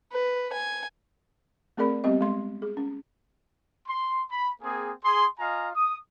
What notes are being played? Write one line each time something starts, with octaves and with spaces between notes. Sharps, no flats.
B4
G#5
A3 C4 G#4 A#4 D5 B5
G3 B3 C4 G4 D#5
G#3 C6
G#4
C#4
C6
B5
A#3 C4 G#4
G#4 C6
F4 D#5 F5 G#5 A#5
D#6